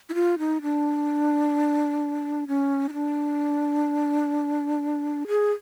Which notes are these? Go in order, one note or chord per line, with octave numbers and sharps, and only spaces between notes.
E4
F4
D#4
D4
C#4
D#4
D4
G#4